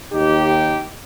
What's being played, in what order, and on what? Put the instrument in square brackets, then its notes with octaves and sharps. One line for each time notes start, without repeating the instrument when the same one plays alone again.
[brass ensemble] D#2 D#4 G4